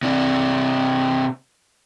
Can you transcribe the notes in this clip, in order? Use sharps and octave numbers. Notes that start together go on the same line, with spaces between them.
C3 D4